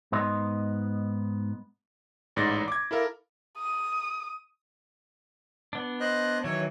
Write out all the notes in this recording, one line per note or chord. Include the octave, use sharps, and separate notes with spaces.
G#2 B3 D#5 C6
A1 G#2 D5 A6 A#6
D6 G#6
E4 A4 A#4 F5
D#6
B3 D4
C5 D#5 F#6
D#3 E3 F#3 C#5